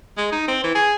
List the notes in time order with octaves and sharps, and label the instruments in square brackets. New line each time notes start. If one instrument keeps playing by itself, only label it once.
[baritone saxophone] G#3
D#4
C4
E3
G#4